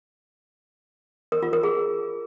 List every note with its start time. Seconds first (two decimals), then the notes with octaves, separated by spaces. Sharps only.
1.32 A#4
1.43 F4
1.53 A#4
1.63 G#4